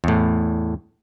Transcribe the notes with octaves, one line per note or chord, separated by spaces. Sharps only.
E2 A2